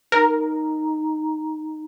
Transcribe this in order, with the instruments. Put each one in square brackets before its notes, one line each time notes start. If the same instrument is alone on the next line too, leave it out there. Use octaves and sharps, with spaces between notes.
[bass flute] D#4 [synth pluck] A#4